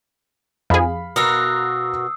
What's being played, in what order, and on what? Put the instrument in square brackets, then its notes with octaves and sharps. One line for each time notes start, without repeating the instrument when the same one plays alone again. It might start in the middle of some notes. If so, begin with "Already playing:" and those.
[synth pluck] F2 G#4 [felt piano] F5 B5
[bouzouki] B2 F#4 A#4 [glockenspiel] D#6 E6 C7